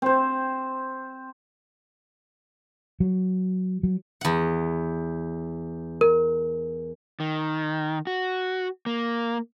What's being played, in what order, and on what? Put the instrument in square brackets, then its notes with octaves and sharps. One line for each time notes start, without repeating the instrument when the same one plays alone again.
[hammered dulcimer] C4 C5
[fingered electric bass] F#3
F#3
[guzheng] E2 F#5
[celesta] A#4
[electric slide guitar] D#3
F#4
A#3